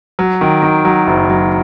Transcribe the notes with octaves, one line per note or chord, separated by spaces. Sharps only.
F#3
D#3
D#3
F#3
F#1
F#3